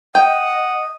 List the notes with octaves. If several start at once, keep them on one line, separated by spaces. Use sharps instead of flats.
D#5 F#5 G5 D#6